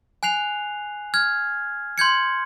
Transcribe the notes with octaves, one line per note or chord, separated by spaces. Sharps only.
G#5 F#6 C7 F7
F6 G#6
C6 G6 G#6 C#7